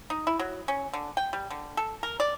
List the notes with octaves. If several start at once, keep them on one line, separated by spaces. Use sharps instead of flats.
D#4
E4
F#3
C#4
D3
G5
G3
D3
A4
A#4
D5